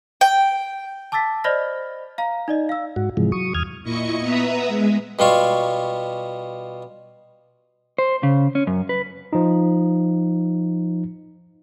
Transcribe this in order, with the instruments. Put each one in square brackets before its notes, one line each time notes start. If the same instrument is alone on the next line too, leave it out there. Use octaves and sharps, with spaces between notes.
[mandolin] G5
[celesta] A5 D6 E6 A6 B6
C5 D5 D#5 B5 F6 A#6
F5 A#5
D#4 D5 D#5
F5 E6
[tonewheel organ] G#2 F#4
G#2 C3 E3 F3 G#3
F#3 C#6 D#6
E2 D#6 F6 G#6
[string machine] A#2 E4 D#5 C#6 C#7
B3 B4 E5 A#5 D#6
G#3
[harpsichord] B2 G3 F4 C#6
[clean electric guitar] C5
C#3
C#4
F#2
B4
[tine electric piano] F3 D#4